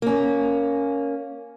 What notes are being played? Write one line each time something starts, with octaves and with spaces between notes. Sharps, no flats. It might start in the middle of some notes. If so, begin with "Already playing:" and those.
A#3 C#4